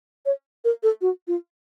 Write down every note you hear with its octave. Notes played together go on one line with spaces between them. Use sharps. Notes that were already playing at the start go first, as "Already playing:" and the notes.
C#5
A#4
A4
F#4
F4